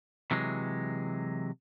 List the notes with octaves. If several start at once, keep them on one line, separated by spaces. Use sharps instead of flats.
C3 E3 F#3 G#3